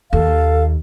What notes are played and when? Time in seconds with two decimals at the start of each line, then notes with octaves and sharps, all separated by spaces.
0.13 D#2 A4 F5